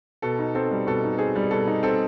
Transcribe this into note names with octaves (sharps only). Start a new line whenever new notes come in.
B2 A4
D#4
C4 A4
G3
B2 A4
D#4
C4 G#4
G3
B2 A4
D#4
C4 A4